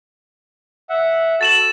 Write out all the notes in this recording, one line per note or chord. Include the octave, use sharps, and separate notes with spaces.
E5 F#5
F#4 A4 A6 E7 F#7